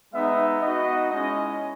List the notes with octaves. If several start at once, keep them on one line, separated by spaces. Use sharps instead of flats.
G#3 B3 D#4 E5
B3 D#4 F#4 D#5
G#3 C#4 E4 D#5